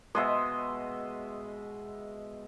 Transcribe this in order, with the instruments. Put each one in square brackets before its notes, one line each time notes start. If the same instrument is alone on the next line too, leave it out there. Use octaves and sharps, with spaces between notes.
[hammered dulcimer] B2 G#3 [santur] D#5 E5